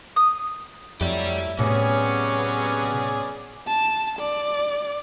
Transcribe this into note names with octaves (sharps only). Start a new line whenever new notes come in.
D#6
F2 F#3 A3 E4 G4 D5
A2 C3 F#3 B3 C#4 G#4 D5
A5
D5